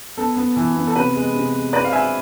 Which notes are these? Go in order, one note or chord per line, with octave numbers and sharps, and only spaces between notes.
B3 A4
B3
E3
B3
A4
C3 B4
G#3
C3
G#3
C4 B4 D5
F5
G#3 E5 G#5